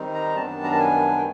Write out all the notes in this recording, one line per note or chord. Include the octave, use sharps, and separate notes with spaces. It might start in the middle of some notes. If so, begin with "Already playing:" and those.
Already playing: D#3 G3 C4 D#4
A#5
F#2 D#3 G3 B3 D4 A5
A#5
A5
G#5
G5